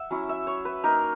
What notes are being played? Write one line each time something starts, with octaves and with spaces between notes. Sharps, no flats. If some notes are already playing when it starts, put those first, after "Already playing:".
Already playing: E5 F#5
F#3 C#4 E4
E5
C#5
B4
A#3 D#4 A#4